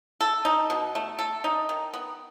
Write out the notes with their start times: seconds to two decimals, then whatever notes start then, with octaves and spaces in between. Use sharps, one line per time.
0.21 A4
0.45 D#4
0.70 B2
0.95 A3
1.19 A4
1.44 D#4
1.69 D#3
1.94 B3